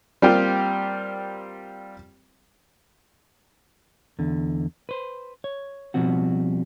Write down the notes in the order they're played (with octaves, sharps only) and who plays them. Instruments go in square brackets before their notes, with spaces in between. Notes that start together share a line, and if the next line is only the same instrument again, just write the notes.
[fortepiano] G3 A#3 C4 F4 G4
[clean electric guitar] E2 D3
B4 C5
C#5
B2 D#3 F3 G3 C4 F#4